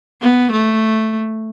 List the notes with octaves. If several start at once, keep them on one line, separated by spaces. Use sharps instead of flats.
B3
A3